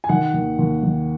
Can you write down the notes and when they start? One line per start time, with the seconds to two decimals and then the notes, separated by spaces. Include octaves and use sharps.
0.04 G#5
0.09 D#3 F#5
0.34 D#2
0.59 D#2
0.83 D#3